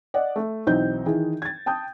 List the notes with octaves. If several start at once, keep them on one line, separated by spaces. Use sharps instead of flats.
D5 D#5 F#5
A3
B1 E3 C4 D#4 G6
D#3 E3 G#4
G#6 A6
G5 A5 D#6 G6